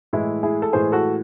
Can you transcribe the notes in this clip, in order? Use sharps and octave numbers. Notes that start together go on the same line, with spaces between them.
A2 E3 G#3 E4
E4 G#4
A4
A2 E3 G#3 G#4 C5
F#4 A4